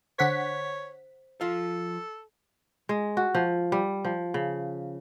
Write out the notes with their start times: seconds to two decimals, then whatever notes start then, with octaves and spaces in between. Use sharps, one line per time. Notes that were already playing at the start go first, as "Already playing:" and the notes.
0.19 D3 C5 C#5 F#5 B6
1.41 F3 F4 A4 F5
2.89 G#3
3.17 F#4
3.35 F3
3.72 G3
4.05 F3
4.34 C#3